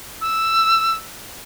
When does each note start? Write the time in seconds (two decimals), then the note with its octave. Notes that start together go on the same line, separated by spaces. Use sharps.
0.21 E6